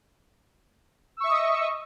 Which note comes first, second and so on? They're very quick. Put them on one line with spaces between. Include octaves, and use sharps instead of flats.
E6 C#6 E5 D#6 D#5